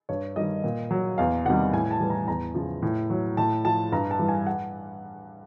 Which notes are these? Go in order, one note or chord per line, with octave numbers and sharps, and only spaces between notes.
G2 C#5
D#3 G3 D#5
A#2
F#3
E2 F5
C3 D#3 G3 F#5
A2 G#5
A5
E3 G3
A#5
E2 A#5
C#3 F3
A2
F#3
A2 A5
F3 A5
G2 A#5
A5
E3 G3
G#5
F#5